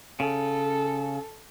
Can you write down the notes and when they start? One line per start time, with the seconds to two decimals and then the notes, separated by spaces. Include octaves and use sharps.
0.20 C#3 A4